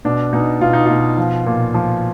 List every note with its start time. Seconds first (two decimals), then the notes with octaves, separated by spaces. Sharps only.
0.05 B2 D4
0.33 B2 D#4
0.61 B2 F4
0.73 D#4
0.86 B2 F4
1.18 F3
1.46 A#2
1.74 F3